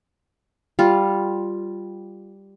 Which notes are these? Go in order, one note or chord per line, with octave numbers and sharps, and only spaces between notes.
G3 F4